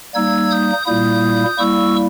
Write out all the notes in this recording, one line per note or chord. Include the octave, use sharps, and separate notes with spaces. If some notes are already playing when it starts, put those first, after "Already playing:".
G3 A#3 D#4 E6 G#6
D#6 G6
A#2 G3 A#3 E4 D#6 G6
G3 A#3 E4 C#6 E6